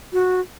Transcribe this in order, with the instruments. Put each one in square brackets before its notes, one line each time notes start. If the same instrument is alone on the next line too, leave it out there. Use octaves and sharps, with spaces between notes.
[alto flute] F#4